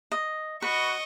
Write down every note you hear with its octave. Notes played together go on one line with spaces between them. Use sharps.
D#5
F#4 B4 D#5 C#6